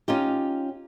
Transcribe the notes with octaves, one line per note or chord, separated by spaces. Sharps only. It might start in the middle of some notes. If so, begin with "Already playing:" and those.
C#4 D#4 F4 G4